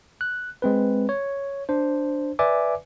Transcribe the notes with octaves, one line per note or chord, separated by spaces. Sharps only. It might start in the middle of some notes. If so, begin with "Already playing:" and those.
F#6
G#3 C4 B4
C#5
D4 C5
B4 D5 E5 G#5 D6